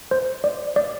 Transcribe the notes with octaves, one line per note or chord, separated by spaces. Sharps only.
C5
D5
D5